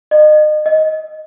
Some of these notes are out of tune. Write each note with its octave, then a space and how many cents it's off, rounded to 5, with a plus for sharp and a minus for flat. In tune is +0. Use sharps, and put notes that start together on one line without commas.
D#5 -35
D#5 +10